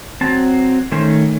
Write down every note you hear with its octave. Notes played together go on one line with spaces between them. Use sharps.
F#3 C4 A5
D#3 A3 C#4 C5